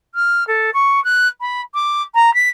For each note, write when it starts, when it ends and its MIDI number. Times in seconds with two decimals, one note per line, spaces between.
0.15 0.47 89
0.47 0.70 69
0.74 1.02 85
1.04 1.28 90
1.41 1.61 83
1.74 2.02 86
2.15 2.34 82
2.34 2.49 95